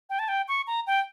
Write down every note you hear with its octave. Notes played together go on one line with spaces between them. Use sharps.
G5
A5
G5
C#6
A#5
G5